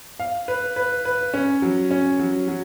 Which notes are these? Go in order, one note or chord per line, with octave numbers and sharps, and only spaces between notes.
F5
B4
B4
B4
C#4
F#3
C#4
F#3
F#3